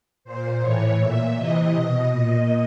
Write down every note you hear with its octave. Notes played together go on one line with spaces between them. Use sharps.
A#2 C5
A2 E3 C#5
A#2 E5
C3 E3 D#5
B2
A#2